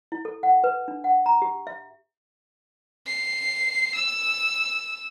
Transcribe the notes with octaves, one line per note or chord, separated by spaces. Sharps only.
E4
A4
F#5
B4
D4
F#5
A#5
G4
E5
C7
E6